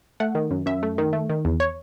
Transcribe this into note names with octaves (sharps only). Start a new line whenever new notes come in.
A3 F#5
D#3
F#2
F#2 E5
A3
D#3
A3
D#3
E2
C#5